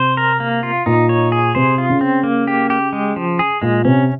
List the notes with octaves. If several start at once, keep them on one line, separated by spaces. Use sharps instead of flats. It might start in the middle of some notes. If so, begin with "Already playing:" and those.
Already playing: C3 C5
A#4
A#3
F4
A#2 D#4
C#5
G#4
C3 C5
F4
C#3
C4
A#3
G4
G4
G#3
F3
G#4
A#2 G#3
C3 C#4